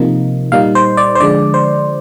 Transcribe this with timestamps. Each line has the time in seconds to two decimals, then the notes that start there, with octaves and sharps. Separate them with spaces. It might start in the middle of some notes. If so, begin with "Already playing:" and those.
Already playing: C3 F3 A#3 D#4
0.52 A#2 G3 A#3 D#4 F5
0.75 C5
0.97 D5
1.15 C5
1.20 D3 F3 G#3 D4 D5
1.54 C5